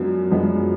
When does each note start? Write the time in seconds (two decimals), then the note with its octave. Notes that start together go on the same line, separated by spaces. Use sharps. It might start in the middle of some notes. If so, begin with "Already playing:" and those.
Already playing: F#2 F3 G#3 B3 D4
0.31 F#2 F3 G#3 B3 D4